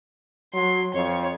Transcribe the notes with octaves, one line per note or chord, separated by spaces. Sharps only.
F#3 C6
F2 C#5